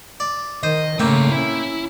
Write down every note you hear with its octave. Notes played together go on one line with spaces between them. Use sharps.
D5
D#3 C5 D#5
A#2 C#3 A3 A#3 C4
C#4 E4